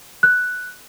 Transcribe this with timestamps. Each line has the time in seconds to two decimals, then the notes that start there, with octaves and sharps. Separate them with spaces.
0.23 F#6